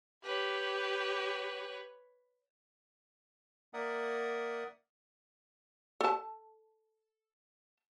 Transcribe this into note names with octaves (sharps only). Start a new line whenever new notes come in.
G4 B4 C#5
A#3 A#4 D5 E5 F#5 D#6
A4 A5